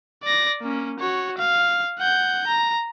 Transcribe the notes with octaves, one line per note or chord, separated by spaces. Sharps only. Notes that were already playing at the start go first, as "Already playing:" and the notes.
D5 A#6
A#3 C#4
F#4 C#5
F5
F#5 G6
A#5